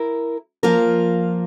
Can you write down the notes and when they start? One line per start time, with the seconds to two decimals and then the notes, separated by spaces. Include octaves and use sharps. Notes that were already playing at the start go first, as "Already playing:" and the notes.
Already playing: E4 A#4
0.63 F3 A#3 F4 A#4